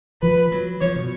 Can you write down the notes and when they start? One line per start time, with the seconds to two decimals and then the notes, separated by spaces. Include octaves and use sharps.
0.22 F3 B4
0.52 F#3
0.81 F3 C#5
0.96 B2